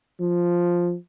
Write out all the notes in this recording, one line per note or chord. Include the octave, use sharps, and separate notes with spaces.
F3